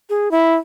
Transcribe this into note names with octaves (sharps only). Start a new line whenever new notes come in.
G#4
E4